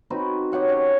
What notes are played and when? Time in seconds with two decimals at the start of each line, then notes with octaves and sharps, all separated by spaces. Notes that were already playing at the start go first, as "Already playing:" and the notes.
0.10 C4 D#4 F#4 B4
0.52 G4 C#5 F#5 G5
0.68 C#4 G#4